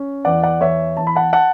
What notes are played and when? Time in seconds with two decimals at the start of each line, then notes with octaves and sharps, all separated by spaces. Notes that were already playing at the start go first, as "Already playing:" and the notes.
Already playing: C#4
0.25 E2 D5 F#5
0.43 D5 F#5
0.61 E2 C#5 E5
0.97 E2 A5
1.07 B5
1.16 F#5 A5
1.33 F#5 A5